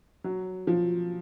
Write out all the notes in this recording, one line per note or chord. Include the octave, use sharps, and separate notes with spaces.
F#3
F3